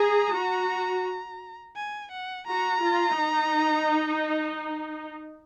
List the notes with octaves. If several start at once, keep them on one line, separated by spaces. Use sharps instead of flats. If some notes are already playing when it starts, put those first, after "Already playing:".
Already playing: G#4 A#5
F#4
G#5
F#5
F#4 A#5
F4
D#4